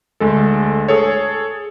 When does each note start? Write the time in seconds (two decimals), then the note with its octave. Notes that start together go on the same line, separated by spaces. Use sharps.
0.20 D2 G#3 A4
0.88 G#4 A4 C#5